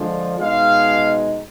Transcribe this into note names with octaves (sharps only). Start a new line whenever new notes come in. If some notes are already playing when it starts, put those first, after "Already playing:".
Already playing: D3 F3 G#3 D4
B2 G#3 D#4 F5